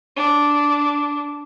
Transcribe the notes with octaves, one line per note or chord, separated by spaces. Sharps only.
D4